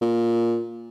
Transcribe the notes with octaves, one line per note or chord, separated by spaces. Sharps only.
A#2